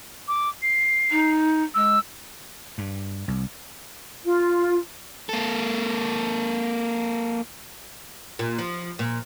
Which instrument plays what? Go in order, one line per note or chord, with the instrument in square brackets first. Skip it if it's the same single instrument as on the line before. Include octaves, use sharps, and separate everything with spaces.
[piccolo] D6
C7
[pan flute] D#4
[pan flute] G#3 [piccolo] E6
[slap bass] G2
C2
[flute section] F4
[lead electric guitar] A#3 A4
[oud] A#2
F3
A#2